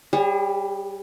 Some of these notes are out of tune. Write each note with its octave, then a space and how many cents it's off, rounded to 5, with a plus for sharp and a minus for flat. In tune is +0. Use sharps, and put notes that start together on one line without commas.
G3 +5 G#4 -35 C#5 +0